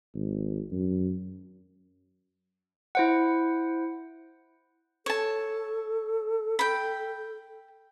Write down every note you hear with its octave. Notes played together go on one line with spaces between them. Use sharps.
G#1
F#2
E4 C5 F#5
A4 C#5 A5
G5 B5